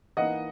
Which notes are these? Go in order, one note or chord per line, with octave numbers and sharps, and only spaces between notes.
E3 A#3 D#4 D#5 F#5